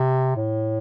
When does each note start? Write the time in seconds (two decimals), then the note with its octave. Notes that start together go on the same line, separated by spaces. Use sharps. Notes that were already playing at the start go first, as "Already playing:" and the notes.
Already playing: C3
0.36 A2